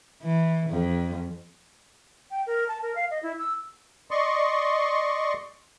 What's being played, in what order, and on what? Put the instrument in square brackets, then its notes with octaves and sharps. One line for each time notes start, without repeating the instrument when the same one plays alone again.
[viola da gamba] E3
F2
[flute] G5
A#4
A5
A#4
F5
D#5
E4
E6
[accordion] D5 D#5 C6 C#6